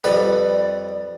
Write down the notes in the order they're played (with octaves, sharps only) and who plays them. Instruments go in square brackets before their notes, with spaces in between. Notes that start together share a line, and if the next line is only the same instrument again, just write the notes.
[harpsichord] F2 G3 B4 [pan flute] D5